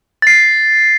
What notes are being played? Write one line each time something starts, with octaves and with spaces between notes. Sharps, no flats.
A6 C7